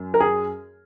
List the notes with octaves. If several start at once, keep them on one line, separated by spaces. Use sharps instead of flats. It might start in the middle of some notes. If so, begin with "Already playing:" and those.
Already playing: F#2
A#4
G#4